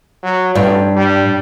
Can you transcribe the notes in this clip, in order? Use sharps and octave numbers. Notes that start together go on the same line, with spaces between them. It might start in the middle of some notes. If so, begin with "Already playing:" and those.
F#3
A1 G2
G3